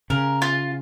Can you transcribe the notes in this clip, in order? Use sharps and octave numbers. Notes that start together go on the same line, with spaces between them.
C#3 A#4
F4